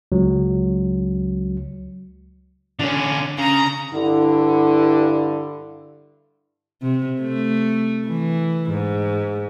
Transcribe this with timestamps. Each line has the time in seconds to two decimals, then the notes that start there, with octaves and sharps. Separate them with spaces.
0.12 C#2 F#3
2.79 D3 C#4 D4
3.38 C#3 A#5
3.93 G2 D3 E4
6.82 C3
7.21 A3
8.07 E3
8.71 G#2